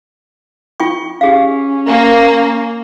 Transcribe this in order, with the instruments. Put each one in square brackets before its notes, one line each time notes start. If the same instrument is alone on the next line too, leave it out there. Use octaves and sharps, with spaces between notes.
[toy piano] F4 G5 C#6
[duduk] C#4 [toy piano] G4 G#4 F5
[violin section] A#3